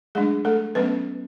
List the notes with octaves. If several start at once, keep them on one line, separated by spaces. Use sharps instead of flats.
F#3 G#3 A3 D4 G#4
A3 A4
F#3 A3 B3 C#4 B4